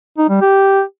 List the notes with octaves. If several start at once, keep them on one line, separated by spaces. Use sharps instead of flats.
D#4
G3
G4